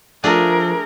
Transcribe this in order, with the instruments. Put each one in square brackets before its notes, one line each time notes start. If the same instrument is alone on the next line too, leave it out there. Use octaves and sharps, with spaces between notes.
[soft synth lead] F3 [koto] A3 D4 G#4 [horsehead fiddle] A#4